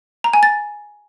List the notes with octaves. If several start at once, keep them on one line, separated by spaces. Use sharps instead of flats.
A#5
G#5
A6